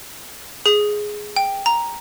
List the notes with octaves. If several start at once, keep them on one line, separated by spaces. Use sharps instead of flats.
G#4
G5
A#5